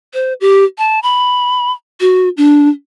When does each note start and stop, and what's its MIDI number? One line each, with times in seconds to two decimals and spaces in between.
0.14 0.33 72
0.41 0.64 67
0.78 1.00 81
1.03 1.72 83
2.00 2.29 66
2.37 2.69 62